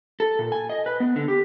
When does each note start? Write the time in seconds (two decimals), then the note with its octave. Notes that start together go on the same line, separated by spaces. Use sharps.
0.20 A4
0.39 A#2
0.52 G#5
0.70 D#5
0.86 B4
1.00 B3
1.16 D3
1.28 G4